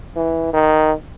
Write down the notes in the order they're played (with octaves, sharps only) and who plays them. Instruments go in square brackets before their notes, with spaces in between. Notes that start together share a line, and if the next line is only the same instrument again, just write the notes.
[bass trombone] E3
D#3